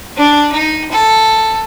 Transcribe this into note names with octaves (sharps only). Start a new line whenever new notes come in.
D4
D#4
A4